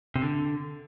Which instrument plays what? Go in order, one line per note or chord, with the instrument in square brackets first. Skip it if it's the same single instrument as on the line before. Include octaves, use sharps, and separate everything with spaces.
[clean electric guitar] C3
D3